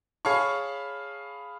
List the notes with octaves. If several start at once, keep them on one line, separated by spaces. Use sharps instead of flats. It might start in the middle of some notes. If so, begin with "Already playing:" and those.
G#4 C#5 F5 A5 B5 C#6